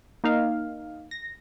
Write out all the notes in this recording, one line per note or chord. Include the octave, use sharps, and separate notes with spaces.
A#3 D#4 F5
A#6